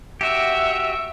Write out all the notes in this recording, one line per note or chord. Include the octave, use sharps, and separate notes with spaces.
F#4 G4 E5